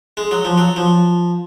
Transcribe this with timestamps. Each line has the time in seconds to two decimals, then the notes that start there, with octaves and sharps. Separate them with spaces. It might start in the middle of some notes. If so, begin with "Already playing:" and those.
0.17 G#3
0.31 F#3
0.45 F3
0.58 F#3
0.76 F3